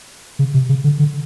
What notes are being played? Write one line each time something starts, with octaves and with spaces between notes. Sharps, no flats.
C#3
C3
C#3
D3
D3